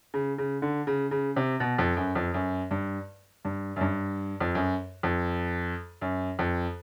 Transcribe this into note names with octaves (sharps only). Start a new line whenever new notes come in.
C#3
C#3
D3
C#3
C#3
C3
B2
F2
F#2
F2
F#2
G2
G2
F#2
G2
F2
F#2
F2
F#2
F2